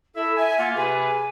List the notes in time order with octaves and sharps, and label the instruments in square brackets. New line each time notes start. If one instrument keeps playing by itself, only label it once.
[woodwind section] E4 E5 [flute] A4
[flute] E5 [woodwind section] G#5
[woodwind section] A#3 F4 [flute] F#5
[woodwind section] C3 G#4 B4 [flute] G#5